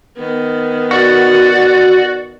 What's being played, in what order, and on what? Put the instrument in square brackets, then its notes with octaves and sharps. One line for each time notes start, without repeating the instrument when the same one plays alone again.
[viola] D#3 B3
[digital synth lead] F#4 [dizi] D5